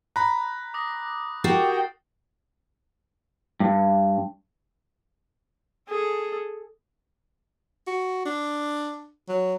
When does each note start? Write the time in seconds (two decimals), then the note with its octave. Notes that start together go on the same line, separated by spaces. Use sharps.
0.16 A#5 B5 F#6
0.74 D6 D#6 A#6
1.44 F#4 G4 A#4 G5 A6 C7
3.60 G2
5.89 G#4 A4
7.87 F#4
8.26 D4
9.29 F#3